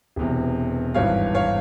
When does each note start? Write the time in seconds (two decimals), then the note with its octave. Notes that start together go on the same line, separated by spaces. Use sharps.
0.16 E1 E2 C3
0.94 G#1 G2 E3 C#5 F5
1.35 C#5 F5